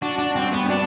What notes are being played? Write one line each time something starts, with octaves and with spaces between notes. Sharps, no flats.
D4 F#4
D4
G2 C4
B3
D4 F#4